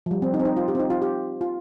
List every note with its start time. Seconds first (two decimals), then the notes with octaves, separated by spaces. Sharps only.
0.06 F3
0.11 G3
0.22 C4
0.34 D#4
0.39 C4
0.45 D#4
0.57 F4
0.68 G4
0.75 C4
0.80 D#4
0.90 F4
1.02 G4
1.41 F4